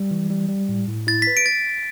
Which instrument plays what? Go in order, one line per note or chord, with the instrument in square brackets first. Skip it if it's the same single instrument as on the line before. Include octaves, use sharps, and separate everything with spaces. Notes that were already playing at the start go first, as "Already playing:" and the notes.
Already playing: [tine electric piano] G3
E3
G3
G3
A2
A2
[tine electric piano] E4 [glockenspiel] A6
[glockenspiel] B6
[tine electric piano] B4
[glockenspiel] D7
A6